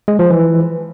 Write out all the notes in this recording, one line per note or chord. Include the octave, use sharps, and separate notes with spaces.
G#3
F3
E3